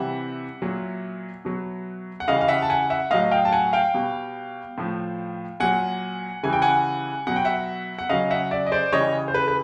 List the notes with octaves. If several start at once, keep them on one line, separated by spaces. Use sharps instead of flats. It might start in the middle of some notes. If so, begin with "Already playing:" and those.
Already playing: C3 E3 G3 E5 F#5
A#2 F#3
B2 F#3
F#5
C#3 E3 G3 D#5 F5
F5
E5 F#5
A5
F#5 G#5
E5 F#5
A2 F#3 D#5 F5
F5 G5
A5
F#5 G#5
F5 G5
B2 G3
A2 F3
A#2 F#3 F#5 G#5
C#3 E3 G3 G#5
G5
F#5 G#5
B2 F#3 F#5
G5
E5 F#5
F#5
C#3 F#3 D#5 F5
E5 F#5
D5 E5
D#5
C5 D5
C#3 E3 G3 C#5 D#5
C5
B4
B4